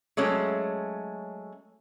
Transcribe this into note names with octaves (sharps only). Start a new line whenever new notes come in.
F#3 G#3 A3 C#4